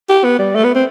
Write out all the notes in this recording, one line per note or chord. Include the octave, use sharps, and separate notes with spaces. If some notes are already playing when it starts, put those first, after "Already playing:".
G4
B3
G3
A3
B3
C4